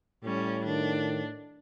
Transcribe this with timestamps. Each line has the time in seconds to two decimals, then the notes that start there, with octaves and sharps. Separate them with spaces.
0.24 A2 G3 C#4
0.64 D#3 D4